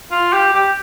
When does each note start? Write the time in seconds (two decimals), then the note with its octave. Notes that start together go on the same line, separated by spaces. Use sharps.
0.11 F4
0.33 G4
0.53 G4